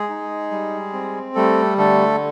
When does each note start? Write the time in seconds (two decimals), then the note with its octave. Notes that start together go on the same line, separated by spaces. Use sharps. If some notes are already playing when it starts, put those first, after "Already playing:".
Already playing: G#3 G#4
0.09 D#4
0.51 G3
0.93 C4
1.35 G3 A3 A4
1.78 D3 A3 A4